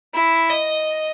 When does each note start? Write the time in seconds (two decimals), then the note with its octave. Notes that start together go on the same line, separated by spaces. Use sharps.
0.15 E4
0.50 D#5